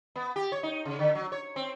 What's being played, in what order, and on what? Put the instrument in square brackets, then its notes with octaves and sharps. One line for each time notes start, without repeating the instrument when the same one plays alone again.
[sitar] B3
G4
C#5
D#4
C#3
D3
F#3
C#5
C4